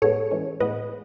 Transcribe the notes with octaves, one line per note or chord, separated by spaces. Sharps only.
A2 G#3 B3 A4 C#5
E3 G#3 C#4
A2 G#3 B3 B4 D#5